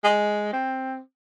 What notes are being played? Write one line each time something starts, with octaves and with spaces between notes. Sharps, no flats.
G#3
C4